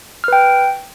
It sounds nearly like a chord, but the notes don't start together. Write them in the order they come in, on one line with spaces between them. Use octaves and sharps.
F6 B4 G5